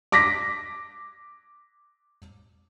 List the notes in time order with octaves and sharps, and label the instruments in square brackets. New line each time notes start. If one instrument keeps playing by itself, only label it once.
[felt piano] D6 A#6 B6